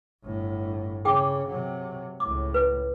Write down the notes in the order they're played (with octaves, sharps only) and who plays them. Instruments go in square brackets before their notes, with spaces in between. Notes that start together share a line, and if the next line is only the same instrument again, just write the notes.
[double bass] G1 A2
[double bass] C#3 [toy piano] G#4 G5 D6
[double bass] C3 F#3
[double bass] C#2 A2 [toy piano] D6
[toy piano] B4